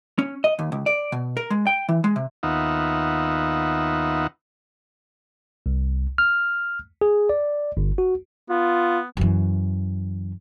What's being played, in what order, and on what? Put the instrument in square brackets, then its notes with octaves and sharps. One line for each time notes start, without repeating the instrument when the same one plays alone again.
[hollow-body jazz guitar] C#4
D#5
D#2
C#2
D5
B2
A#4
G#3
G5
E3
G#3
C3
[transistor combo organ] D#2 B3 D#4 F4 E5 F#5
[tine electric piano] C2
F6
G#4
D5
G1
F#4
[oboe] B3 [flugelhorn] F4
[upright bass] F#2 E3